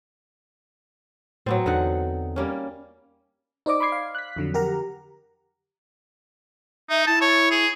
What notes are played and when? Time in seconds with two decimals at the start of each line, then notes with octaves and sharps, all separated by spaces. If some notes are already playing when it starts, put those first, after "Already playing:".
1.46 A2 F#3 B3 C4
1.66 E2 D3 D#4 F#5
2.36 G3 A#3 C#4
3.66 D#4 C5 D5 D#5 D6
3.80 B5 C6 D6 G#6 C7
3.92 F5
4.15 F#6 B6
4.36 F2 D3 F#3
4.54 G4 A#4 F#5 A#5
6.90 D#4 E5
7.07 E4 A5
7.21 C#5
7.51 G#4